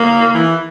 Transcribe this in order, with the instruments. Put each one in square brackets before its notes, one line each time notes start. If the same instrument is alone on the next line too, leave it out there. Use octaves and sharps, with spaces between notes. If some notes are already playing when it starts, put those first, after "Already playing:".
Already playing: [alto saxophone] A#3
E3